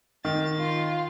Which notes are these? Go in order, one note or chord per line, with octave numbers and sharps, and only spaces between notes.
D#3 A6
F4